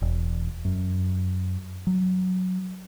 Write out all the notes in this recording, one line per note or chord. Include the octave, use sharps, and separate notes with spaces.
E1
F#2
F#3